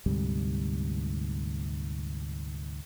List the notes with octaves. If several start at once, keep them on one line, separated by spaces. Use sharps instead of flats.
D2 G#2 C3 G3